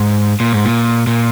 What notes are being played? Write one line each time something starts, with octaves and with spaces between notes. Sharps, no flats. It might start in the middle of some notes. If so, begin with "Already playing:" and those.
Already playing: G#2
A#2
G#2
A#2
A#2